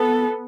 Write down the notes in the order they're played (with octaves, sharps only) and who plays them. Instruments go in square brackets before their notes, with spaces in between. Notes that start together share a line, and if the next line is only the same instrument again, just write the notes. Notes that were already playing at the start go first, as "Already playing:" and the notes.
Already playing: [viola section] B3 [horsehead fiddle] A4